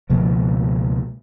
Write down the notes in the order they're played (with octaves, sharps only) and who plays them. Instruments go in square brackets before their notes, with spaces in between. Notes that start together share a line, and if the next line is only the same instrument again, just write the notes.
[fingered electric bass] C#2 B2 F3 A#3